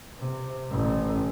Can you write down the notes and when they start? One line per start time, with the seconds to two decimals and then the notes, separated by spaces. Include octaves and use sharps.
0.17 C3
0.71 A1